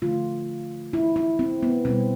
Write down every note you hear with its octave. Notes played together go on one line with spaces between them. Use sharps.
D3 F3 A3 F4
E4
E4
C4
B3
B2 G3 C4